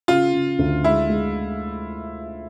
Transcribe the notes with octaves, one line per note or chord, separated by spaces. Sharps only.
C#3 F4
C#3
D2
G#3 E4
G#3